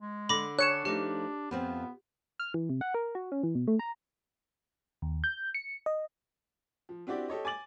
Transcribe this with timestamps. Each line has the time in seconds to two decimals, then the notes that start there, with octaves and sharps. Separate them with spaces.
0.01 G#3
0.29 D3 B5 D6 A#6
0.59 D4 C#5 F#6 C#7 E7
0.85 F3 A3 D#4 G4
1.51 F2 F3 B3 C4
2.40 F6
2.54 E3
2.70 C3
2.81 F#5
2.94 A#4
3.15 F#4
3.32 C#4
3.43 E3
3.55 B2
3.67 A3
3.79 A#5
5.02 D#2
5.24 G6
5.54 C#7
5.86 D#5
6.89 F3
7.07 C4 D4 E4 F#4 G4 D5
7.28 G4 A4 C#5 D#5
7.45 G#5 D6 A6 F#7